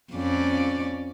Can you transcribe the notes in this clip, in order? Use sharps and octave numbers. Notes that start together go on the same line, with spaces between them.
F2 C#4 D5